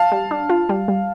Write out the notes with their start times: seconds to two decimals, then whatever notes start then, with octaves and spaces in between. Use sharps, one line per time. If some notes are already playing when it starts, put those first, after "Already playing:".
Already playing: F5 A5
0.12 G3
0.31 D4
0.49 F4
0.69 G3
0.88 G3